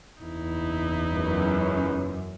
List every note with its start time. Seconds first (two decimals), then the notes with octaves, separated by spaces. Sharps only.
0.21 F#1 E2 D#4 E4
1.15 C#2 F#2 C#4 B4